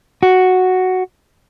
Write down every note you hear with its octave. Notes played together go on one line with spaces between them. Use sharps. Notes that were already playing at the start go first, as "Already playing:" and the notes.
F#4